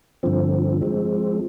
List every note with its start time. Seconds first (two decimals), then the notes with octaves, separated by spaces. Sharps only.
0.23 G2 D3 F3 C4
0.81 F3 G#3 C4